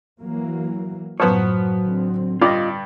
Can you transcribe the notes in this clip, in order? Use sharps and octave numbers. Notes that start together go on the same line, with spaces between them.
E3 F#3 A#3
F#2 A2 F3 F#3 B3 C5 C#5
A1 D3 C4
G2 F4 D5 D#5